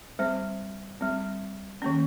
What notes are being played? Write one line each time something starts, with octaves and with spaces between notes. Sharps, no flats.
G3 C4 C5
G3 C4
D#3 A#3 C#4